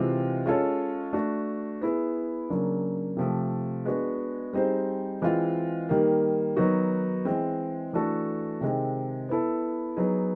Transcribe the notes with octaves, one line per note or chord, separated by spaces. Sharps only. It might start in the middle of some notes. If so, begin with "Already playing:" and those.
Already playing: C3 E3 G#3 C4 F4
G#3 C#4 F4 A4 C#5
A3 D4 F#4
B3 E4 G#4
C#3 F#3 A#3 D4
C3 F3 A3
G#3 B3 D4 F#4
G3 C4 D#4 G#4 C5
E3 G#3 C4 F4
D#3 G3 A#3
D#3 F#3 B3 D#4 F#4
E3 G#3 C4
E3 A3 D4 F#4 A4
C3 D#3 G#3 C4
B3 E4 A4
F#3 B3 D#4 G#4